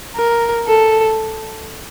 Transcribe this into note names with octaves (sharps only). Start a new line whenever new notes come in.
A#4
A4